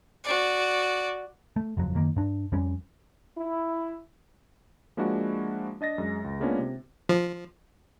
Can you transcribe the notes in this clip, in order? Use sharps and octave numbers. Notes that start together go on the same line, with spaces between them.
F#4 D5
A3
F#1 E2 F3 F#3
F#2 D#3 A#3
G2 D4
F2 G3 C#4
E4
F3 G#3 A#3 D4 E4 F#4
D4 D#5 A6 A#6
F#2 G#3
C#2
G#3 A#3 B3 C#4 D4 F4
C3
F3